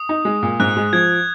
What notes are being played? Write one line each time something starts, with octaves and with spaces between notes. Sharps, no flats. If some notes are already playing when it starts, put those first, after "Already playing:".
Already playing: D#6
D#4
G#3
A#2
G#2 F#6
G#3
F3 G#6